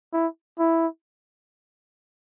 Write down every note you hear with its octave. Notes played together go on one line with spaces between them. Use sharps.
E4
E4